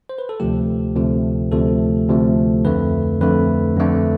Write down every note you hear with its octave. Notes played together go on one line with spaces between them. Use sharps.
C5
B4
A4
D2 C3 F3 A3 G4
D2 C3 F3 A3
D2 C3 F3 A3 A4
D2 C3 F3 A3
F2 D3 A3 B4
F2 D3 A3 B4
F2 D3 A3